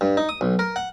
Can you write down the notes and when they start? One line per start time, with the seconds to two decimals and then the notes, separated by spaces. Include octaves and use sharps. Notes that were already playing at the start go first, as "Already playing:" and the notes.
0.01 G2
0.17 D#4
0.29 D#6
0.41 B1
0.59 A#4
0.76 F#5